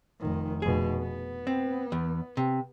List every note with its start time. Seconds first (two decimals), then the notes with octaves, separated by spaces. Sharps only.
0.19 F1 D#3
0.62 F1 B2 G#4
1.00 B3
1.47 C4
1.92 E2
2.37 C3